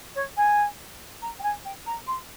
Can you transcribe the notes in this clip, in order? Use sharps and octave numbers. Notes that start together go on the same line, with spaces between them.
C#5
G#5
A#5
G5
G#5
G5
A#5
C6